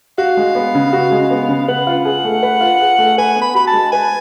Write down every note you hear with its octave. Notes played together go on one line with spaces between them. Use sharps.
F#4 F5
G#3
B3
C#3
F#4
G#3
B3
C#3
B4 F#5
F4
G#4
A3
B4
F4
G#4
A3
B4 G#5
B3
B5
F#4 B5
A5
G#3
B4 G#5